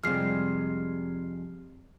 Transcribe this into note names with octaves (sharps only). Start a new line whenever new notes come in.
F2 C3 G3 G#3 F6 C7